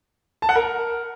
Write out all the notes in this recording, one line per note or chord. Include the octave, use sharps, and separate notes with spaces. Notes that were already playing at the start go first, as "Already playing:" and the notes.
A5
F#5
A#4